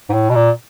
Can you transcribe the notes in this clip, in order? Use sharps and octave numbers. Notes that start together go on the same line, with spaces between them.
G#2
A2
B2
A#2